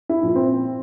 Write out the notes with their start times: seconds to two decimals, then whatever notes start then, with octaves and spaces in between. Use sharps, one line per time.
0.09 E4
0.23 A#2 F3
0.36 C4